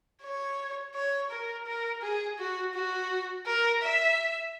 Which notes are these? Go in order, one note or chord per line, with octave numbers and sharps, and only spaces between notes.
C#5
C#5
A#4
A#4
G#4
F#4
F#4
A#4
E5